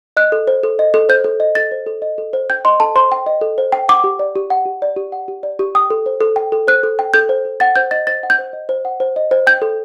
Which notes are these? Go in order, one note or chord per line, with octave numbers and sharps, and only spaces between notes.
D#5 F#6
A4
C5
A4
D#5
A4
C5 G6
A4
D#5
A4 A6
C5
A4
D#5
A4
C5
G5 G6
D#5 C6
A4 A5
C5 C6
G5
D#5
A4
C5
G5
F#5 D6
G4
D5
G4
F#5
G4
D5
G4
F#5
G4
D5
G4
G5 D#6
A4
C5
A4
G5
A4
C5 F#6
A4
G5
A4 G6
C5
A4
F#5 A6
C5 G6
D#5 A6
C5 A6
F#5
G6
C5
D#5
C5
F#5
C5
D#5
C5
G5 G6
A4